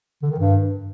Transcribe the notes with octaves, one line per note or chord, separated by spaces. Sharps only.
D3
D#3
G2